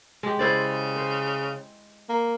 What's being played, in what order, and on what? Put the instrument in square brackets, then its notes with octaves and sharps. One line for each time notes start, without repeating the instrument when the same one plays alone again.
[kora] G#3 G4
[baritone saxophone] C#3 [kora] E4 C5 D5
[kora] C5
[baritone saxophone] A#3